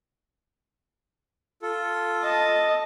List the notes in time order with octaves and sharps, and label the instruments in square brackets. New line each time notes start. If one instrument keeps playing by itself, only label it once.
[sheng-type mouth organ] F4 A4
[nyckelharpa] D#5 A5